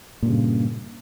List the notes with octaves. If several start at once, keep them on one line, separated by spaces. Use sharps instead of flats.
G2 A#2 C#3